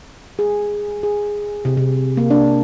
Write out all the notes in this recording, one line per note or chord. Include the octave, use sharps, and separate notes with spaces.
G#4
G#4
C3
C3
A#3
D4